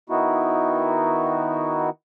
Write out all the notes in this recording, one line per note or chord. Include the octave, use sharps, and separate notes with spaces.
D#3 B3 D#4 E4 F#4